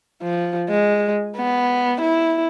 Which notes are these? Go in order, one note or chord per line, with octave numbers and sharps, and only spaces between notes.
F3
G#3
B3
E4